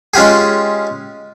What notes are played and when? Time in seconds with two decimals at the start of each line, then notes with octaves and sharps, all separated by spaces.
0.14 G#3 C#4 F4 G4 G#4